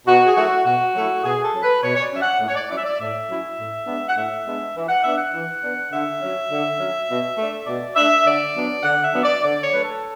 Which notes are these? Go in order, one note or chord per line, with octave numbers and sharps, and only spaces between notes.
B2 F#4
G#4
F#3 A3 E4 F#4
B2 F#4
F#3 A3 E4
B2 G#4
A4
F#3 C#4
B4
B2 C#5
C#5
D5
F#3 C#4 E5
F#5
A2
C#5
D5
F#3 C#4 E4 D5
E5
D5
A2 E5
F#3 C#4 E4
A2
G#3 B3 D4
F#5
A2 E5
G#3 B3 D4
E3
F#5
B3 D4 E5
F#5
E3
B3 D4
D3 E5
F#3 C#4
D3
F#3 C#4
B2
A3 D4
B2 D5
A3 D4 E5
D3 D5
F#3 B3 D4
D3 F#5
E5
F#3 B3 D4
D5
D3 D5
C#5
F#3 A3 D4 B4
A4